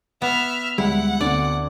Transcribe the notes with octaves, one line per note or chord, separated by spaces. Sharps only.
B3 E5 F#5 F6
D2 G3 G#3 E4 F#5
D2 B3 C4 D5